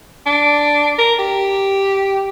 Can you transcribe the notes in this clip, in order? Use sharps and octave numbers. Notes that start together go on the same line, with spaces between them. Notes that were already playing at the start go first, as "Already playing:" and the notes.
D4
A#4
G4